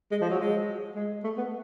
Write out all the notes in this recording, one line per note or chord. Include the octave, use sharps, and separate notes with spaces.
G#3
F3
F#3
G#3
G#3
A3
B3